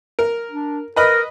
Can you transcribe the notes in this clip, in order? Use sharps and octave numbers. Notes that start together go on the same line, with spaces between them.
A#4
D4
A#4 B4 D#5 B5